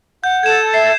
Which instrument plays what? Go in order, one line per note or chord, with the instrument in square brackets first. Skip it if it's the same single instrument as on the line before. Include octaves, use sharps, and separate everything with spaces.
[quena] F#5 [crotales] G6
[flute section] A4 [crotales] G#6 E7
[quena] E5 [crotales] C7